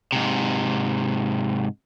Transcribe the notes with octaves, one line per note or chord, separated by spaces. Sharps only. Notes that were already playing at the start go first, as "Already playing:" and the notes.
G#2 C3